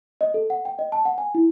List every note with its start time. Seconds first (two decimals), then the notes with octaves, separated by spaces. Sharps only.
0.21 D#5
0.34 A4
0.50 F#5
0.65 G5
0.79 D#5
0.92 A5
1.05 F#5
1.18 G#5
1.35 E4